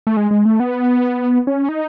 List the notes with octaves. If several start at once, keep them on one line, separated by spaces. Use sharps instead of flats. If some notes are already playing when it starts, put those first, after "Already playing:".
A3
G#3
G#3
A3
B3
C#4
D#4